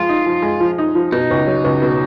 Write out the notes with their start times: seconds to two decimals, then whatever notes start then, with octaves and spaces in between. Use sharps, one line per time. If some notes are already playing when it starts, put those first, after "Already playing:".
Already playing: F3 G#3 F4
0.09 D#4
0.26 F3
0.42 G#3
0.60 F3
0.78 D#4
0.95 F3
1.12 B2 D#4
1.30 C#2
1.47 F#3
1.64 C#2
1.82 B2